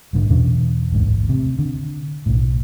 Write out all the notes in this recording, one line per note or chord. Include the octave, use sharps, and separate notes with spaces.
A#1 G#2 D3
E2 B2 C#4 D4
A1 D2 G#2
C3
D3
B1 A2